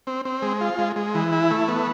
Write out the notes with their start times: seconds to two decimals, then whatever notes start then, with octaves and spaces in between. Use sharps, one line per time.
0.07 C4
0.25 C4
0.42 G#3
0.61 F4
0.78 G#3
0.96 G#3
1.15 E3
1.32 E4
1.51 A3
1.68 B3